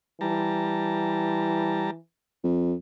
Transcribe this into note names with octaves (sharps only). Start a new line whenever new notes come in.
E3 G3 A5 A#5
F2